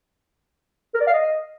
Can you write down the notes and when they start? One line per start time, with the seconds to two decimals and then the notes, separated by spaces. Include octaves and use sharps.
0.94 A#4
1.01 D5
1.07 F5
1.13 D#5